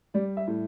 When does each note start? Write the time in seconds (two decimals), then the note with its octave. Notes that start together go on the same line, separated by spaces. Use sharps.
0.14 G3 D5
0.37 E5
0.47 A2